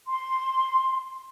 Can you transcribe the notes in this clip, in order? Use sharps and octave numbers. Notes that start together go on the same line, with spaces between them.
C6